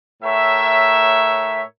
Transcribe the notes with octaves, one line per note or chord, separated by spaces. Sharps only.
A2 A#4 C#5 E5